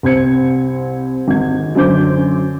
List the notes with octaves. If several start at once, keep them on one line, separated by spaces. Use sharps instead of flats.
C2 C4 C5 G#6 C#7
G#1 G#6
F#2 D3 F#3 C5 D6 G6